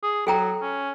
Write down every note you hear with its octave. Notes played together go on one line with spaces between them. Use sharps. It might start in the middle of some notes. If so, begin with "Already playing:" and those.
G#4
F#3 A4 G5 A#5
C#4